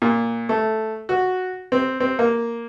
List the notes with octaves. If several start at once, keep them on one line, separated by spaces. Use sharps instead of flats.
A#2
A3
F#4
C4
C4
A#3